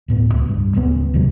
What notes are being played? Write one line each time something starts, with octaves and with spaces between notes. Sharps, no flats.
D1 A2 B3
C#2
G2
D1 C#2 D#3 B3
D#2 A2 C3 F#3